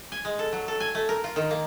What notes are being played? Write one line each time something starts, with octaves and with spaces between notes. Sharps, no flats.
G#5
G#3
A4
F#3
A4
G#5
A3
A#4
F4
D#3
A#3